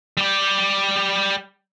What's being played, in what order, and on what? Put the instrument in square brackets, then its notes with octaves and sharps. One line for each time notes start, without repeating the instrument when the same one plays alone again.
[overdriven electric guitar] G3 G4